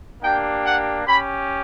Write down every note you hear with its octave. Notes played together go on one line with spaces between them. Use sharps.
A#3 D4 G4 G5
F#5
C#4 G4 B5